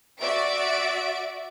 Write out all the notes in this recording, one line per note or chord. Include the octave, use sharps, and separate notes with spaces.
F#4 D5 E5 D7